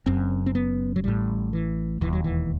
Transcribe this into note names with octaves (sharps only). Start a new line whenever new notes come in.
F#1 F#2 C4
C4
B3
F#3
A1 A2 G3
E3
E1 D#2 E3
F#3
E3